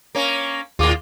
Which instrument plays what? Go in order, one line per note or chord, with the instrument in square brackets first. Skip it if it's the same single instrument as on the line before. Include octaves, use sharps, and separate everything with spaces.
[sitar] A#3 C#4
[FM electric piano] D#2 G#4 D6 [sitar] A2 F4